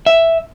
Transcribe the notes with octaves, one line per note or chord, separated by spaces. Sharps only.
E5